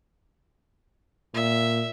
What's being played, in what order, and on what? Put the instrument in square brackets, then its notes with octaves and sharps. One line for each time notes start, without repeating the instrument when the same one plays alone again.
[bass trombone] A#2 [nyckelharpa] E5